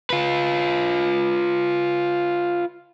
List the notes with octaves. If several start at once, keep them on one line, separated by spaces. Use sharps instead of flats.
F4 B4